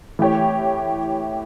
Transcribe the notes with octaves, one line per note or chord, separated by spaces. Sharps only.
E3 A3 E4 G4 C#5